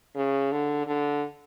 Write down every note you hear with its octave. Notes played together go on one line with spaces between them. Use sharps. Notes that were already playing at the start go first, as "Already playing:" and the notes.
C#3
D3
D3